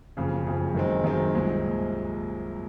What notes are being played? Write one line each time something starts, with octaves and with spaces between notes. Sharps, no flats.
F#1 F2 C#3
F#1 F2 C#3
F#2 D#3 G#3 C4
F#2 D#3 G#3 C4
C2 A#2 G#3 C4